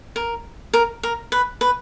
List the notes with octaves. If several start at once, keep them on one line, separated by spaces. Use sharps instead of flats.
A#4
A#4
A#4
B4
B4